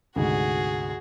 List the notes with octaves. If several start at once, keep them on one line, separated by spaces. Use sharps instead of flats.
D2 G#2 C3 F#4 G#4